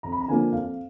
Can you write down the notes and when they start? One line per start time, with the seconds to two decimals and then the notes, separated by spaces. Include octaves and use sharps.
0.03 F2 A#5
0.12 B5
0.21 A#5
0.28 D3 F3 A#3 G#5
0.52 F2 F5